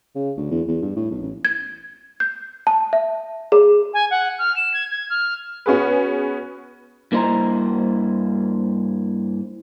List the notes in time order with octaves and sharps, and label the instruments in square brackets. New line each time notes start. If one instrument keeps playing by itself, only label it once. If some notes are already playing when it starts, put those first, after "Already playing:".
[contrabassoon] C#3
D2
E2
E2
G2
A2
B1
A1
[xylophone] G#6
G6
A5
E5
G#4
[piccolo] G#5
F#5
F6
E7
G#6
G#6
F6
[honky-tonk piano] B3 C#4 F#4 G#4 B4
[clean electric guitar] G2 A#3 E4 C5 D#5 A#5